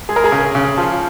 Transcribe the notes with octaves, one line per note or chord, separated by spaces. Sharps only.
G#3 G#4
A#4
G#4
C#3
C#3
F3